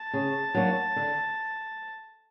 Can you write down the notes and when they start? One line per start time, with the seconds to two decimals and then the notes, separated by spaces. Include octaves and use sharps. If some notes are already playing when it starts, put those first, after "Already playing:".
Already playing: A5
0.13 C#3
0.54 F#3 A#3 D4 F#4
0.96 D3